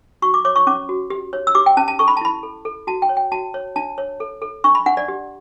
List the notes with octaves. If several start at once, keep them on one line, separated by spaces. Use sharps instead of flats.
F#4 C#6
D6
C#5 D6
C#6
C#4 D6
F#4
G4
C#5
E6
G4 D6
G5
C#4 A5
A5
A4 C#6
B5
A5
E4 B5
A4
A4
F#4 A5
G5
C#5
G5
F#4 A5
C#5
D4 A5
C#5
A4
A4
D4 C#6
B5
D4 F#5
D5
G4